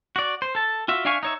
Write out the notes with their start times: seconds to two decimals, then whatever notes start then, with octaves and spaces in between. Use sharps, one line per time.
0.16 F#4 D5
0.42 C5
0.55 A4 A5
0.88 F4 F#4 E5
1.05 D4 E5 F5 G#5 C#6
1.23 D#4 C#5 E5